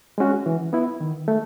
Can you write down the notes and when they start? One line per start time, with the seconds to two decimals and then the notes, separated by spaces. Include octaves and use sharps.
0.18 G#3 C#4 F#4
0.46 E3
0.73 B3 E4
1.00 D#3
1.28 A3